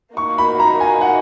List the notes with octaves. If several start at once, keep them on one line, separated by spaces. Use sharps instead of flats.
A#3 D#4 F#4 C#6
B5
A#5
G#5
F#5